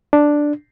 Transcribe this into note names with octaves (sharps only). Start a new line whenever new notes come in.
D4